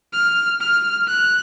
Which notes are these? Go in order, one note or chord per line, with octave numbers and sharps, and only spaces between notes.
F6
F6
F#6